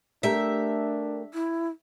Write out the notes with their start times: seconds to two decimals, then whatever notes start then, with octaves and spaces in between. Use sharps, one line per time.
0.23 A3 D4 G4 A#4 E5
1.34 E4